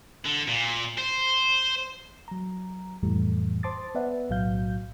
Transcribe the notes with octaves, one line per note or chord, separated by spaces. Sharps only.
D3
A#2
C5
F#3 A#5
F2 A2 E3 G3 A3
C5 A5 C6 D6 D#6 A6
B3 B4 D5 E5 F#5
B1 A2 F#3 F5 G6